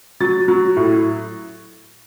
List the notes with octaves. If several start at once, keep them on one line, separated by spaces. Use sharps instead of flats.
F#3 A6
F#3
A2